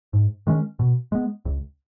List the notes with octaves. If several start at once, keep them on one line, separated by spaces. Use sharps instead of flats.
G#2
D#3 G#3 C#4
B2
G#3 B3
C#2